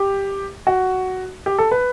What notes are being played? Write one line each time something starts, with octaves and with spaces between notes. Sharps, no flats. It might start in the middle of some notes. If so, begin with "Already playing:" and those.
Already playing: G4
F#4
G4
A4
B4